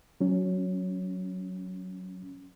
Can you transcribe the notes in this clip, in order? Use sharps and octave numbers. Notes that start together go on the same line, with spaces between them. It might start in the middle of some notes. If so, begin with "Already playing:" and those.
F#3 C#4